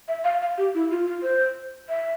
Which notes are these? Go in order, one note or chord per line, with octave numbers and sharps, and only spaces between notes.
E5
F5
F5
G4
E4
F4
F4
C5
E5